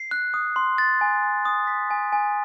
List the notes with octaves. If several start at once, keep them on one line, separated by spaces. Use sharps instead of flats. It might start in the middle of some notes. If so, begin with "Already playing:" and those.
Already playing: C7
F#6
D#6
C6
A6
G#5
G#5
D#6
B6
G#5
G#5